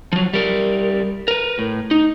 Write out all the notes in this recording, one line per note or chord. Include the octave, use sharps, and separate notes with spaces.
F3 F#3
G3 A#4
A#4 B4
A2
D#4